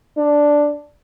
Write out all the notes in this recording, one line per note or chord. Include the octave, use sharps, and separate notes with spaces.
D4